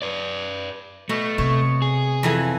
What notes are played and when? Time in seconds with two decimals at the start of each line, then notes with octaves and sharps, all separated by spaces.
0.02 B4 D5
1.09 B2 A3
1.38 C3 C#5
1.82 G#4
2.23 F2 E3 G#5